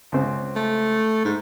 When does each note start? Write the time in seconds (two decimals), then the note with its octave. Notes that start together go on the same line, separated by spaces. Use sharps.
0.12 C#2 C#3 C4
0.56 A3
1.25 G#2